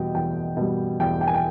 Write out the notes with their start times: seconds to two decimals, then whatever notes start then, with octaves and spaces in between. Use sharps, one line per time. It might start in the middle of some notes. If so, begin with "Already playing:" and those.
Already playing: E2 B2 G3 D#5 G5
0.15 E2 G5
0.57 B2 G3
1.00 E2 G5
1.21 G5
1.27 G#5
1.34 G5